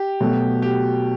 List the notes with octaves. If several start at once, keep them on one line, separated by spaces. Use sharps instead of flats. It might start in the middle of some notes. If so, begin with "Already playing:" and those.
Already playing: G4
B2 F#3 A3
G4